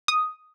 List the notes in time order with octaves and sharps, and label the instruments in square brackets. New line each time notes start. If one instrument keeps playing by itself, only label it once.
[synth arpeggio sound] D#6